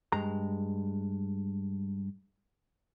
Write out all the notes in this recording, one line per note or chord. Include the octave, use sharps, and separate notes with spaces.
G2 G#3 A#5